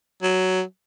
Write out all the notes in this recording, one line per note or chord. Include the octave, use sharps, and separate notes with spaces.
F#3